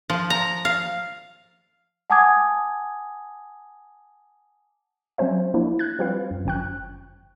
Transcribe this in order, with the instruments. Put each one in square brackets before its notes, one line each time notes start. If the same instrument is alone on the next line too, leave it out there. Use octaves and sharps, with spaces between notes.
[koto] F3
A#5
F5
[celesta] F#5 G#5 A5 D6 D#6 G#6
[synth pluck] F#3 C4 C#4 C5 E5
F3 A#3 D4 E4
F#6 G#6
F3 G3 C4 F4 B4 F5
F#2
G1 F#2 F3 G5 C#6 F#6